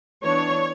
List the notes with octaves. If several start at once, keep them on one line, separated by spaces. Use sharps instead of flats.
E3 B3 D4 C#5